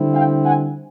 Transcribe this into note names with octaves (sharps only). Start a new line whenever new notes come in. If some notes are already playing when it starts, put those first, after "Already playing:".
Already playing: D3 G3 C4 E4
F5 G5
F#5 G#5